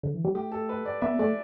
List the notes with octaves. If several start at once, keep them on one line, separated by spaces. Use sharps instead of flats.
D3
E3
G3
A3 G4
A4
B4
D5
B3 E5
A3 D5